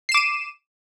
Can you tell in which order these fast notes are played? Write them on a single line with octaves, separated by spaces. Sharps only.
C7 E7 D6 D#7